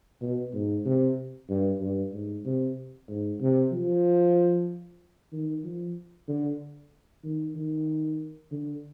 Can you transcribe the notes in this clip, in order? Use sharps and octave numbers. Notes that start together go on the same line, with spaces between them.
B2
G#2
C3
G2
G2
G#2
C3
G#2
C3
F3
D#3
F3
D3
D#3
D#3
D3